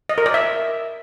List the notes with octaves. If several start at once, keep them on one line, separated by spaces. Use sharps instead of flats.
D#5
A#4
D5
E5